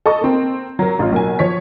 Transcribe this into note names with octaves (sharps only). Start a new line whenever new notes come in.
A4 D#5 C#6
A#3 C4
F#3 A#4
A1 F4
B1 A#3 G#5
F3 C#5 B6